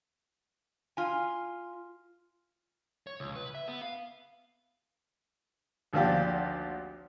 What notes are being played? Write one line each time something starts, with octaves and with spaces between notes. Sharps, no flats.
F4 G#5
C#5
C#2
B4
E5
B3
F5
G#1 D2 F3 A#3 D4 G4